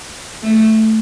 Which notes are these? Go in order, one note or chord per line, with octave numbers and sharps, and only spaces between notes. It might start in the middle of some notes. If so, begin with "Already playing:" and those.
A3